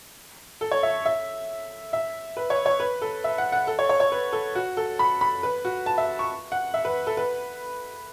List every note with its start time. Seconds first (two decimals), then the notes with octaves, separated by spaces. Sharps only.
0.61 A4
0.71 C#5
0.83 E5
1.05 E5
1.93 E5
2.37 B4
2.50 C#5
2.66 C#5
2.80 B4
3.02 A4
3.24 E5
3.38 F#5
3.52 F#5
3.67 A4
3.79 C#5
3.89 C#5
4.00 C#5
4.12 B4
4.33 A4
4.55 F#4
4.77 A4
4.99 B5
5.21 B5
5.43 B4
5.65 F#4
5.86 A5
5.98 E5
6.19 C#6
6.52 F#5
6.74 E5
6.85 B4
7.07 A4
7.17 B4